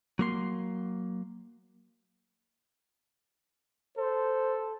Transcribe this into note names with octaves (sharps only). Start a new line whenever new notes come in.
F#3 A#3 C6
A4 C5